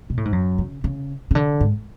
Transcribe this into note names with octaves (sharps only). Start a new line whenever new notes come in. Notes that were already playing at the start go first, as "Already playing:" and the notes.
B2
A2
G#2
F#2
C#3
C#3
C#3
D3
G#2